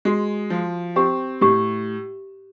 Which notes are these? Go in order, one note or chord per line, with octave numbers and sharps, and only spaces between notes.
G#3 F#4
F3
C4 G4
A2 G4